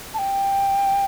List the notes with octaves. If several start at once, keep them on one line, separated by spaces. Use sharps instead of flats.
A5
G5